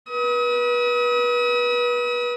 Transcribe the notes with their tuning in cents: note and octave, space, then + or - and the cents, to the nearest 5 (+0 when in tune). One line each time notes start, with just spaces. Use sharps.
B4 -30 D#6 +45